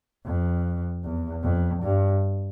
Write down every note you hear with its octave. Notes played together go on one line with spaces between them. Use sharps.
F2
E2
F2
G2